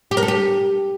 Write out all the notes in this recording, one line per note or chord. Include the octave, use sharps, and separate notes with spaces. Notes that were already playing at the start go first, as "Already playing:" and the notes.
G4
A#4
A4
G4